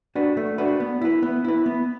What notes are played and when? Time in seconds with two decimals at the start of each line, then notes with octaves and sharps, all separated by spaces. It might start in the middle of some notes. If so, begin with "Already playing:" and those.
0.15 D4 F#4 B4
0.37 A3
0.58 D4 F#4 B4
0.80 B3
1.01 E4 B4
1.23 B3
1.45 E4 B4
1.66 B3